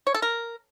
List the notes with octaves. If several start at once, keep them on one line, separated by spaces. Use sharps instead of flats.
C#5
A4
A#4